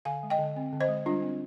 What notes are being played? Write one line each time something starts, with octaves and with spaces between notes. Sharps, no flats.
D3 F5 G#5
G#3
D#5 G5
D3
C4
D3
C5 D#5
G#3
G3 D4 F4
C4